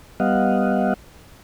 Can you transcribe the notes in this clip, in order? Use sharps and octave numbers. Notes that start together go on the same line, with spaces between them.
G3 B3 D#5 F5 F#5